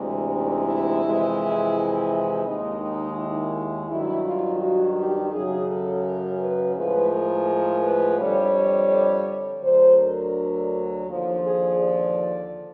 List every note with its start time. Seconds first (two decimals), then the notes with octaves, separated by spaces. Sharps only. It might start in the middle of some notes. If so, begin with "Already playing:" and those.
Already playing: D2 C3 E3 G#3
0.30 D#4
0.66 E4
1.01 F2 C3 E3 G#3
2.45 D#2 D#3 G#3 D#4
2.81 D#4
3.17 E4
3.88 G2 D#3 F#3 E4
4.25 F4
4.60 F#4
4.96 G4
5.32 F#2 C#3 F#3 G#4
5.68 A4
6.04 A#4
6.40 B4
6.76 A2 F3 G#3 B4
7.11 A#4
7.47 A#4
7.82 B4
8.19 F2 D3 G3 C#5
9.62 D2 D3 F#3 C5
9.98 A#4
11.06 D#2 D3 F3
11.42 G#4
11.77 D5